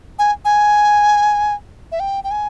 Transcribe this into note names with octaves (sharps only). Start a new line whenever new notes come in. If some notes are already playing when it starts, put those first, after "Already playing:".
G#5
G#5
E5
G5
G5
G#5